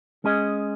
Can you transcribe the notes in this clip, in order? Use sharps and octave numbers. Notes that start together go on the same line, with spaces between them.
G#3 C#4 G#4 D#5